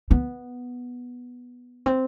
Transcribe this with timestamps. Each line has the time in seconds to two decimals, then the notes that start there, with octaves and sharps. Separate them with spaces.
0.11 B3
1.86 C4